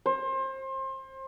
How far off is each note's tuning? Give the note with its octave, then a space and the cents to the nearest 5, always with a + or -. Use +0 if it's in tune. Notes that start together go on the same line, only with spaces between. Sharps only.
C5 +30